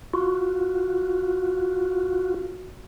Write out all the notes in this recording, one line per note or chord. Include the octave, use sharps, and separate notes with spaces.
F4 F#4